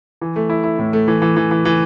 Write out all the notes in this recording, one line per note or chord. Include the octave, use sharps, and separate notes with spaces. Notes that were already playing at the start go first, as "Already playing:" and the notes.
E3
A3
E4
E4
A2
A3
E3
E3
E3
E3
E3